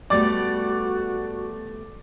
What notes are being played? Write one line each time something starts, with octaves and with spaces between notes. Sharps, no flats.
G3 A3 B3 F#4 D5 D6 A6